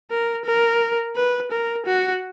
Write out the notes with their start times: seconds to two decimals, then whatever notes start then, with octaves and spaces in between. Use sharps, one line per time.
0.11 A#4
0.45 A#4
1.16 B4
1.51 A#4
1.86 F#4